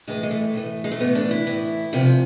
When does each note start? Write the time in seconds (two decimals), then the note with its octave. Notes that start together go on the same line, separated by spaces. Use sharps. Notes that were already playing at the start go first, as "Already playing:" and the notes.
0.07 A2 E3 G#3
0.23 G#3
0.31 A3
0.54 A2 E3
0.84 G#3
0.91 A3
0.99 A2 E3 B3
1.15 D4
1.31 E4
1.47 A2 E3
1.93 D2 C3 F3 F4